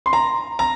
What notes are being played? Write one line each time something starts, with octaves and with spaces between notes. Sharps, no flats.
C6
A#5
A#5